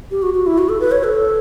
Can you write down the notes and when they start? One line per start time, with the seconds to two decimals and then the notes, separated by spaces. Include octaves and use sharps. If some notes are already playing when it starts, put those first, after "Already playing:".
0.11 G4
0.22 F#4
0.34 F#4
0.46 E4
0.58 F#4
0.69 A4
0.80 B4
0.92 C#5
1.04 A4